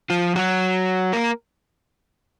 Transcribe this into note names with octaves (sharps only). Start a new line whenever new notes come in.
F3 F4
F#3 F#4
A#3 A#4